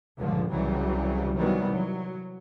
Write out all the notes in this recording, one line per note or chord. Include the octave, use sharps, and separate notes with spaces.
C#2 G2 A#2 D3 F3
C2 C#3 E3 F#3 G3
C3 D#3 E3 F#3 G3 B3
F#3